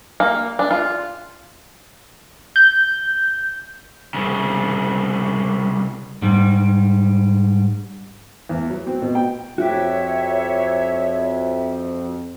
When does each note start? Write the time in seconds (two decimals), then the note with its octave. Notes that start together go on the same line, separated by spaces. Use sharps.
0.20 A#3
0.59 D4
0.71 F4
2.56 G6
4.14 C2 C#3
6.22 G#2 G3
8.49 E2
8.69 F#3
8.87 C4
9.02 B2
9.15 G5
9.58 F2 C4 F#4 G4 C#5 E5